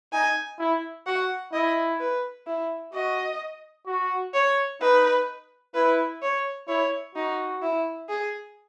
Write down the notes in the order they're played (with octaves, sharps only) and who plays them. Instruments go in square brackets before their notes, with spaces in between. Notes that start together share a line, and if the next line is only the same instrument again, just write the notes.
[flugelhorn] D#4 [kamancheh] G#5
[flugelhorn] E4
[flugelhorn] F#4 [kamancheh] F#5
[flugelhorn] E4 [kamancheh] D#5
[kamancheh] B4
E4
[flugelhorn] F#4 [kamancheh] D#5
[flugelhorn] F#4
[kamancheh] C#5
[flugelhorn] D#4 [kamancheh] B4
[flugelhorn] E4 [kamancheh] B4
[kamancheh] C#5
[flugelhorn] E4 [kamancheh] C#5
[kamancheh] D#4 [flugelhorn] F#4
[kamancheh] E4
G#4